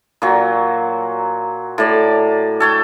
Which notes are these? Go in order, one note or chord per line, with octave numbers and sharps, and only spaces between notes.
A#2 F#3
A2 D5
A4 C#5 G5